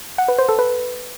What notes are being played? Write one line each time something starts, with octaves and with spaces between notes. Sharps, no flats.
F#5
B4
C5
A4
B4